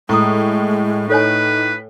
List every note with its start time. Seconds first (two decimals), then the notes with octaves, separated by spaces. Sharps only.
0.09 A2 G#3 A#5 C#6 D#6
1.10 D#4 A4 B4 C#5 G#5